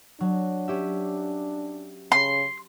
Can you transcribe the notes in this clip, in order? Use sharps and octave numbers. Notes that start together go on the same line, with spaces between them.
F#3 D4
C#4 G4 E5
C#3 C6